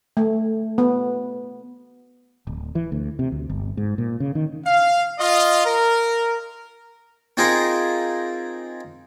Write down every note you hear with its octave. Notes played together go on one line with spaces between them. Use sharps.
A3
B3
D1
E3
D2
C3
D2
G1
G#2
A#2
C#3
D#3
F5
F4 D#5
A#4
C4 D#4 F4 G#4 A#4